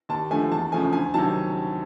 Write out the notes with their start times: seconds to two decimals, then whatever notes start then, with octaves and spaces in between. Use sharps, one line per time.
0.09 D#2 A5
0.31 D3 F3 A3 G#5
0.52 E2 A5
0.72 C#3 F3 A3 G#5
0.92 D2 G#5
1.14 C3 D#3 F#3 A5